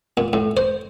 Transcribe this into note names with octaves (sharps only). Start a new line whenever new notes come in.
A#2
A2
C5